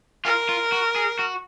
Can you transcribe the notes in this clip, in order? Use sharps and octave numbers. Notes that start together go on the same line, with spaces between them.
F4 A#4
F4
F#4
G#4
F#4